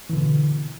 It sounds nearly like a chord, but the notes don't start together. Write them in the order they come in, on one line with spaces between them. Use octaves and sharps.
E3 D3 B2